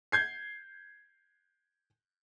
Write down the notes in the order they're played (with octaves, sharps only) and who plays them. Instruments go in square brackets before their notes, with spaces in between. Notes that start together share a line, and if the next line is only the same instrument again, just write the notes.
[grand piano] G6 G#6 C7